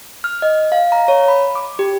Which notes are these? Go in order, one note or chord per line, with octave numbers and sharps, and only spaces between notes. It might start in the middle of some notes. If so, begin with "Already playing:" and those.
F6
D#5
F5
A#5
C#5
B5
D6
G4